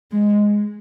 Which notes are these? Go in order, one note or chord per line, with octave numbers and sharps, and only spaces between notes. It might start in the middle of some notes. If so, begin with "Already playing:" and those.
G#3